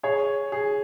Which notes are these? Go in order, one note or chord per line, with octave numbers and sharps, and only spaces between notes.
G#4 C#5
G#4